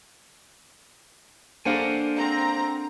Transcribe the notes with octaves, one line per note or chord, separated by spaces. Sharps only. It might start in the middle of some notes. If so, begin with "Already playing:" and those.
A#3 D4 A4 A#4 C5 F5 F#5 G#5
C4 A#5